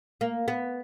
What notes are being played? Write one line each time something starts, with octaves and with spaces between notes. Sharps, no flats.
A#3
B3